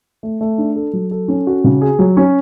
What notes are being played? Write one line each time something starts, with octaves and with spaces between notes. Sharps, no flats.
A3
A3
D4
A4
F#3
A4
C#4
F#4
C#3
G#4
F#3
C#4